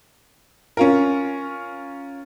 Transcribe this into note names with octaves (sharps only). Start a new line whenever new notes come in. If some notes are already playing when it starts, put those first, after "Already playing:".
C#4 F4 A#4